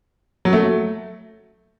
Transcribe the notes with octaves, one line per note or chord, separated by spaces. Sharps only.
F#3
A3